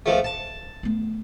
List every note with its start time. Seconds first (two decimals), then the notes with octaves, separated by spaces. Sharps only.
0.06 C#2 F3 A3
0.24 A5
0.83 A3 B3